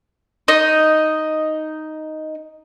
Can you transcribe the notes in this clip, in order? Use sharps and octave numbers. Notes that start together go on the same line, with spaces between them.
D#4 D#5